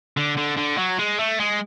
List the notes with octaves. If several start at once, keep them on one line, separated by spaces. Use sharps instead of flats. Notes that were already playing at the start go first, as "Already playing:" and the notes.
D3
D3
D3
F#3
G#3
A3
G#3